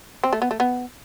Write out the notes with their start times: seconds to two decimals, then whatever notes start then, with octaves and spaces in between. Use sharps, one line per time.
0.24 C4
0.33 A3
0.42 B3
0.51 A3
0.60 B3